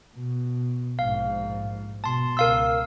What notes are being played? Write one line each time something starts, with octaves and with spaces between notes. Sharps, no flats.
B2
A#1 G#2 F5
B2 A5 C6
C#2 A#4 F5 E6